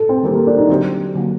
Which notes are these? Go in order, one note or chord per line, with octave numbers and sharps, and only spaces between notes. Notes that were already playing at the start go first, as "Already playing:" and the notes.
Already playing: A4
C4
D#3 G3 A#3 C4 G4
A#3
D4
D#4
D3 F#3 C4 F#4 G4 C5
D3 F#3 A#3